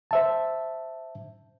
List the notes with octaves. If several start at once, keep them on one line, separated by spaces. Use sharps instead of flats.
C5 E5 A5